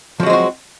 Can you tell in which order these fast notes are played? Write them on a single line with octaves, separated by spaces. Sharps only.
F3 F#3 G#3 C4 F#4